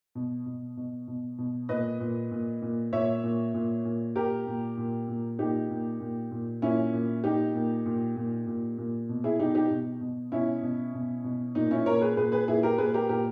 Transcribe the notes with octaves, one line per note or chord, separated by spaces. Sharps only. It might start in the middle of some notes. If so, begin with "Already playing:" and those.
B2
B2
B2
B2
B2
A#2 B4 D#5
A#2
A#2
A#2
A#2 C#5 E5
A#2
A#2
A#2
A#2 G4 A#4
A#2
A#2
A#2
A#2 D#4 G4
A#2
A#2
A#2
A#2 C#4 E4
A#2
A#2 D#4 G4
A#2
A#2
A#2
A#2
A#2
B2
E4 G#4
B2 D#4 G4
D#4 G4
B2
B2
B2 C#4 E4
B2
B2
B2
A#2 D#4
C#4 E4
A#2 A#4 C#5
G#4 B4
A#2 G#4 B4
G#4 B4
A#2 E4 G#4
G4 A#4
A#2 G#4 B4
G4 A#4
A#2 G4 A#4